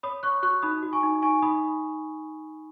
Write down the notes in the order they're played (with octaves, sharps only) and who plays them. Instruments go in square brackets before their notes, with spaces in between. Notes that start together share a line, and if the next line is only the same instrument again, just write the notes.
[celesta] C#5 B5 D#6
C#5 C#6 F#6
F#4 C#6 F#6
D#4 B5 D#6
F#4
G#5 C#6
D#4
D#4 G#5 C#6
D#4 B5 D#6